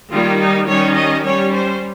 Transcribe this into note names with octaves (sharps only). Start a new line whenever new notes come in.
D#3 G3 A#3 F4
D#4
D#3 G3 C#4 C#5
D#5
G3 C#4 C#5
C5